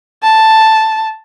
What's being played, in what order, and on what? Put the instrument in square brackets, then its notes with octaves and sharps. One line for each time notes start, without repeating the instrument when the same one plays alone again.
[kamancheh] A5